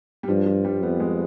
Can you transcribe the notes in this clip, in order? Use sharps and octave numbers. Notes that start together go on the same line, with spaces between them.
G3
G2 F3
F3
G3
F2 B3
G#3